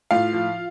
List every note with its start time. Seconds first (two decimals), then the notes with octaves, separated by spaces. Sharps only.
0.11 A2 F4 F5
0.33 F3